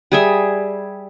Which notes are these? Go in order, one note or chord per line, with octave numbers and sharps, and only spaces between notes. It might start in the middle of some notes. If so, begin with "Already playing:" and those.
G3 G#4 E5